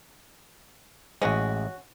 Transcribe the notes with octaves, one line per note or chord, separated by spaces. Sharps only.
A1 G#3 C#4 F#4